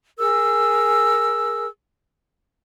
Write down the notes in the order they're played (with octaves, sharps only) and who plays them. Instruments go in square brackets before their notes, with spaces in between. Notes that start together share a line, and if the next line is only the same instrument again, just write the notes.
[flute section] G#4 A#4 E6